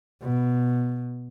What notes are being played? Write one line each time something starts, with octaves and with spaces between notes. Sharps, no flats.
B2